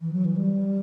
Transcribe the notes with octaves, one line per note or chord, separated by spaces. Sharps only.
E3
F#3
E3
G3